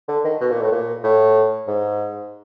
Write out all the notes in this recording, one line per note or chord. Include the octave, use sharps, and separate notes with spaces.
D3
D#3
B2
A#2
A2
A#2
A2
G#2